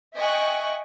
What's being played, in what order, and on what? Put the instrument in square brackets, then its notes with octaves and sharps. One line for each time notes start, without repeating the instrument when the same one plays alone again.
[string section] D#5 E5 G5 G#5 C#6 F#6